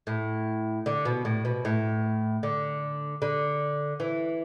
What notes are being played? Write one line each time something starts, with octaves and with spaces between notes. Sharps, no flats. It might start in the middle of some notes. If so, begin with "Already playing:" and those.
A2
D3
B2
A2
B2
A2
D3
D3
E3